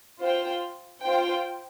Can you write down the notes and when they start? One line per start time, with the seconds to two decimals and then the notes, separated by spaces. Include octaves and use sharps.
0.22 F4 C5 G5
1.02 F4 C5 G5